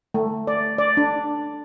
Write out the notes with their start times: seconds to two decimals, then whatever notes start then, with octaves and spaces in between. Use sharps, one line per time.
0.14 A3
0.47 D5
0.78 D5
0.97 D4